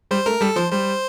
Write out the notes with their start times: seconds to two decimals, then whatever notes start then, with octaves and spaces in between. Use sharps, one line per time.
0.11 G3 C5
0.26 A3 A#4
0.41 G3 A4
0.56 F3 C5
0.72 G3 C5